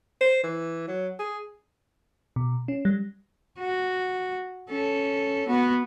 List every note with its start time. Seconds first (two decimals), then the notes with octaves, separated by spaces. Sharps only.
0.21 C5
0.43 E3
0.87 F#3
1.19 G#4
2.36 B2
2.68 C#4
2.85 G3
3.59 F#4
4.70 C#4 A4
5.48 B3 F#4